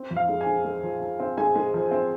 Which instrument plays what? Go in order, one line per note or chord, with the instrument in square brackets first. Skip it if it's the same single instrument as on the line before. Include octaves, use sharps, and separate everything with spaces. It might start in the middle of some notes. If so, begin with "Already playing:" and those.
Already playing: [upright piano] C4
F2
F5
G#3
G#5
G#3
G#3
F3
F3
C4
G#3 G#5
G#3
F3
C4